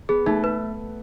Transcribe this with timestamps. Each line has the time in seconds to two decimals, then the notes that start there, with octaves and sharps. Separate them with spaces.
0.09 B3 G#4
0.26 A3 D#4
0.44 B4